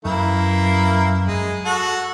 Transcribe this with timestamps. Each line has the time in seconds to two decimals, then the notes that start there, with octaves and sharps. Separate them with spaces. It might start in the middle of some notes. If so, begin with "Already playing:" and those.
0.05 F#2 E3 A#3 E4
1.26 G#3
1.65 F#4 A4 F#5